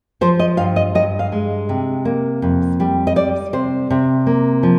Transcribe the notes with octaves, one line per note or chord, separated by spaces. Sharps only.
F3 C5
D#5
G2 F5
D#5
G2 D#5
F5
G#3
C3
A#3
F2
G3
D#5
G3 D5
C3 C5
C3
A#3
F3